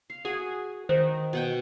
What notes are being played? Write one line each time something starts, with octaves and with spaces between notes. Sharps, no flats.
F5
F#4 G#4
D#3 C5
B2 F#5 G5